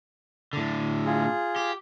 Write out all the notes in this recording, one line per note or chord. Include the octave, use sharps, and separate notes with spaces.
A2 D3
F4 G#4
G4